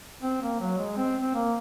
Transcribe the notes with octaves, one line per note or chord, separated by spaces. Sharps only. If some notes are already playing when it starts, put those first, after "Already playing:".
C4
A#3
F#3
G#3
C4
C4
A#3